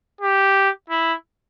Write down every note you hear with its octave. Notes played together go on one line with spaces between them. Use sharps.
G4
E4